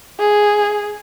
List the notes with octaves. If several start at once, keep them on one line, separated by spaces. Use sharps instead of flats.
G#4